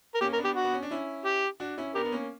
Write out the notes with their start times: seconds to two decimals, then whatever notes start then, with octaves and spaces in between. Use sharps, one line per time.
0.15 A#4
0.21 A#3 C#4 G4
0.33 A#4
0.38 B3 D4
0.45 G4
0.56 F#4
0.64 B3
0.74 C#4
0.83 D4
0.91 C#4 E4
1.26 G4
1.60 D4 F#4
1.77 C#4 E4
1.95 B3 D4 G4 A#4
2.05 B3
2.12 A#3 C#4